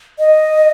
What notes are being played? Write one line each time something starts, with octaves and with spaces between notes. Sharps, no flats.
D#5